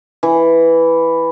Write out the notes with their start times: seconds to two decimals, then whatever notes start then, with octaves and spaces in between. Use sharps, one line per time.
0.23 E3